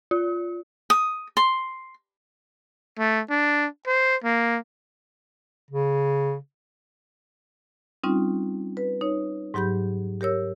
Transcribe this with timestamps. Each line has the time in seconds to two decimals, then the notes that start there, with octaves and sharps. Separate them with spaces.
0.11 F4
0.90 D#6
1.37 C6
2.99 A3
3.30 D4
3.87 C5
4.24 A#3
5.70 C#3
8.04 G3 C4 C#4 D#4 F4
8.77 B4
9.01 D#4 C#5
9.54 G#2 F#3 G4 B5 G6
10.21 G4 A#4 C#5 E6